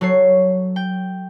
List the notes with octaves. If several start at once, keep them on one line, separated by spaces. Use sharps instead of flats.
F#3 A4 C#5 C7
G5